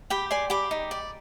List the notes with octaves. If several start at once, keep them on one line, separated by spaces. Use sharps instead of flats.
G4 G5 B5
D5 G#5 C6
G4 B5 D6
D#4
D5